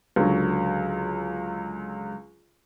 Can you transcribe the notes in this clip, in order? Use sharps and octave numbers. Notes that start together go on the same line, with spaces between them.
C#2 D3 F#3